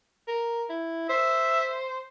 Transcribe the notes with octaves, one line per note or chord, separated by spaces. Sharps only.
A#4
E4
C5 E5